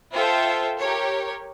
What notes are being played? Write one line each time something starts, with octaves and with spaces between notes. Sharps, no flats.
F4 A4 C5 E5 G5
G4 A#4 C#5